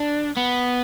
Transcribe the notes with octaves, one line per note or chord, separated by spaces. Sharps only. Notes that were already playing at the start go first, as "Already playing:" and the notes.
Already playing: D4
B3